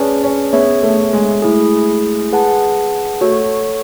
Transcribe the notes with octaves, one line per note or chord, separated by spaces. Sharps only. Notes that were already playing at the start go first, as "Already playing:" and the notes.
Already playing: C#4 G#4 B4 D5 A5
C#4
B3 G#4 C#5 E5
A3
G#3
A3 E4 G#4
G#4 B4 F#5 A5
A3 F#4 A4 C#5